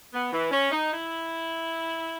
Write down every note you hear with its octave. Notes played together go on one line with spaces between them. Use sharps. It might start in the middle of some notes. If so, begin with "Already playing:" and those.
B3
E3
C#4
D#4
E4